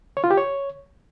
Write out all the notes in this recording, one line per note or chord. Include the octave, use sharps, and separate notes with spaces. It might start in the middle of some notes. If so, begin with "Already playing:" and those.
C#5
F4
G4
C#5